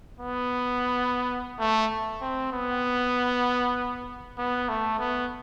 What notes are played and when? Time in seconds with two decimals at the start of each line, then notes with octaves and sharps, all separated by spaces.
0.20 B3
1.59 A3
2.21 C4
2.52 B3
4.38 B3
4.69 A3
4.99 B3